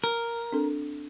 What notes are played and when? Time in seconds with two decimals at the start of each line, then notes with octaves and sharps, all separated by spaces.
0.04 A#4
0.52 C4 D4 A4